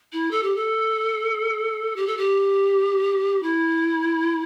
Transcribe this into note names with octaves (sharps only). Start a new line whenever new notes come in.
E4
A4
G4
A4
G4
A4
G4
E4